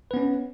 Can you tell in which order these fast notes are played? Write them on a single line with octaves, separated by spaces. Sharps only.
B4 B3 C#4